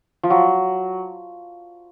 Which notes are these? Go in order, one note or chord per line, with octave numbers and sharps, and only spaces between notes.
F3
F#3